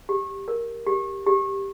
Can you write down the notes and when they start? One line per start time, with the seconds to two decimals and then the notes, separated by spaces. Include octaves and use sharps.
0.09 G4
0.48 A#4
0.87 G4
1.26 G4